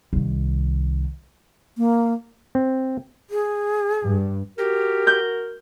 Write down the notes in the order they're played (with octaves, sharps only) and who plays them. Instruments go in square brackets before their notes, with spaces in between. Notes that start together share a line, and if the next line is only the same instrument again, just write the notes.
[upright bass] C2 D#3
[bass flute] A#3
[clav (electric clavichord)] C4
[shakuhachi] G#4
[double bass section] G2
[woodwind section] F#4 A#4 [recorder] G4
[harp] G6